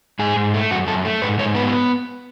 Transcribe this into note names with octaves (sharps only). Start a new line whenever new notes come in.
G#2 G#4
G#2
A3
F#2 F#4
F#2 A4
A3
G#2 B4
G#2 C#5
B3 B4